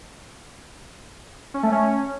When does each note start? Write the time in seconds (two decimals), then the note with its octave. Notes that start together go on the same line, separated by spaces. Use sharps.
1.54 C#4
1.63 A3
1.72 C#4